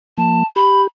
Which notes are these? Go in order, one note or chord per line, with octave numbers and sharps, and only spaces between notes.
F3 A#3 A5
G4 B5